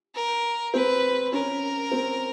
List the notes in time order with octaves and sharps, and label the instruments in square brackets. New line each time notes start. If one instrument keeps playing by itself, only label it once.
[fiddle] A#4
[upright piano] C4 [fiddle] B4
[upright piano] C#4 [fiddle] A#4
[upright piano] C4